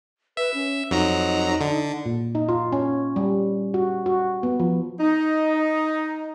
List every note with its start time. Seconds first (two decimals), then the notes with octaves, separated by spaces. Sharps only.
0.37 B4 E5
0.54 C#4
0.91 F2 F#3 D#4 A#5
1.61 D3
2.06 A#2
2.35 D#4
2.49 F4
2.72 C#4
3.16 G3
3.74 F#4
4.06 F#4
4.43 B3
4.60 F3
5.00 D#4